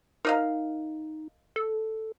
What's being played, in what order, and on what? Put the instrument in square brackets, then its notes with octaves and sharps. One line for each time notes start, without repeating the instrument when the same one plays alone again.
[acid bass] D#4 [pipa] A#4 D#5 F5
[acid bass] A4